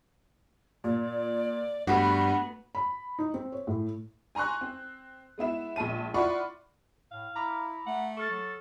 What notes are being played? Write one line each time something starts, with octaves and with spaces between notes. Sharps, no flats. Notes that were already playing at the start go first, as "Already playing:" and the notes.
A#2 D5
G2 A3 B3 F#4 B5
B5
D#4
C4
C#5
A2
G#5 A#5 C6 C#6 F#6
C4
G#3 B3 E4 E7
A#1 G#3 A5 D#7
E4 F4 D5 F#5 B5 C#6
A2 F5
E4 A#5 B5 D6
A3 F#5
A4 C#6 F6 A6
F#3